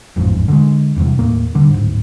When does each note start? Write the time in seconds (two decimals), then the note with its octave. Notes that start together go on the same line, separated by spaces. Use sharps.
0.16 D#1 A1 F2 G#2
0.48 D3 E3 G#3
0.96 D#1 E2 G2 C3
1.19 D#2 A2 A#3
1.55 D3 G3
1.70 D1 G#2